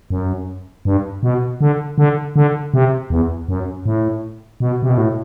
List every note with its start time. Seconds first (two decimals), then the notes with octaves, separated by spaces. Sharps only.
0.10 F#2
0.85 G2
1.23 B2
1.61 D3
1.98 D3
2.36 D3
2.74 C3
3.10 E2
3.49 F#2
3.86 A2
4.60 B2
4.83 C3
4.89 B2
4.97 A2